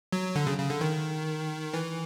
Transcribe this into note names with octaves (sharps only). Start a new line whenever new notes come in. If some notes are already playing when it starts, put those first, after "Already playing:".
F#3
D3
C#3
C#3
D3
D#3
E3